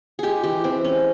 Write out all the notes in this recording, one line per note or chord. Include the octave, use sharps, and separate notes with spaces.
G#3 G4 G#4
E3 G4
E3 C4
G#3 C#4